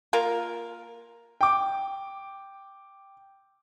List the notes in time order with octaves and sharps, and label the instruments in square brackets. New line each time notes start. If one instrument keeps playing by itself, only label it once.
[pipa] A#3 F4 A#4
[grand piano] G5 D6